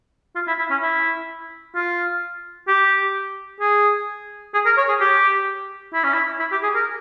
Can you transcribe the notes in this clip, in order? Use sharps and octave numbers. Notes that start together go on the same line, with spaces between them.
F4
E4
E4
C#4
E4
F4
G4
G#4
G#4
A#4
C#5
G#4
G4
E4
C#4
E4
E4
G4
G#4
A#4